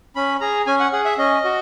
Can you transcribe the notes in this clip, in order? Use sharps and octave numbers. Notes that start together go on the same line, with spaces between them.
C#4 B5
G#4 A#5
C#4 G#5
F#5
G#4 F#5
E5
C#4 D#5
F#4